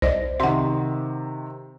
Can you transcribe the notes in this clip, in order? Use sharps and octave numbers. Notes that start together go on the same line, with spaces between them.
C2 C5 D5 D#5
C3 D#3 E5 F#5 C6